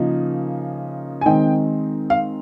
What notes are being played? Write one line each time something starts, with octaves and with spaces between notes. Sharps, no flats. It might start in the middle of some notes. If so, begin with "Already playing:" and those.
Already playing: C#3 F3 A#3 D#4
G#5
D#3 G#3 C4 D#4 G5
F5